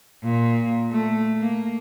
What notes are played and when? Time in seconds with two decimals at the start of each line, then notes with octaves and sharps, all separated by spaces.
0.24 A#2
0.91 A3
1.38 A#3